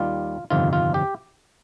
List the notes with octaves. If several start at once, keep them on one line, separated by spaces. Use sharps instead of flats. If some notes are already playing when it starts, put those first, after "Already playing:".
Already playing: D#2 D#3 G3 F4
G1 F2 C3 D#3 F4
F4
G4